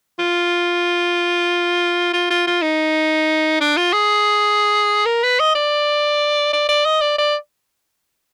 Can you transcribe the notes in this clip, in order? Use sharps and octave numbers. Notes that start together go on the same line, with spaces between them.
F4
F4
F4
F4
D#4
D4
F4
G#4
A#4
B4
D#5
D5
D5
D5
D#5
D5
D5